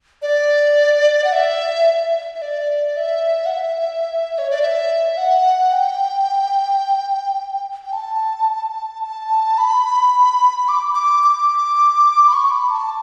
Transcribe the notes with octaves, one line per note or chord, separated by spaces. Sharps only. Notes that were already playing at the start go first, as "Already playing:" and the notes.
D5
F#5
E5
E5
D5
E5
F#5
E5
C#5
D5
E5
F#5
G5
G5
A5
A5
B5
D6
D6
D6
B5
C#6
B5
A5